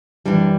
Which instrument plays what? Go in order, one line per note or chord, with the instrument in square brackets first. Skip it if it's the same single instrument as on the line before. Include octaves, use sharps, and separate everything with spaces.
[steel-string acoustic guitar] F#2 E3 G3 D4